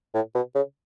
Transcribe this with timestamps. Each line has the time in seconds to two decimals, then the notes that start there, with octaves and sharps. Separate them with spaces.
0.14 A2
0.35 B2
0.55 C#3